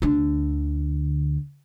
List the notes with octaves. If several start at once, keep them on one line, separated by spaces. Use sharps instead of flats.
D2 D3